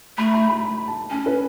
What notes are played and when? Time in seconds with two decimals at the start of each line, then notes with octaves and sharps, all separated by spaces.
0.18 A3 B5
0.34 B5
0.49 B5
0.64 B5
0.88 A5
1.11 C#4 G#5
1.26 B4